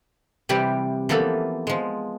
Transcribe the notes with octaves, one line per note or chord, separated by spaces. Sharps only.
C3 E3 G3 G4 B5
E3 F3 A#3 B3 A4
F3 G#3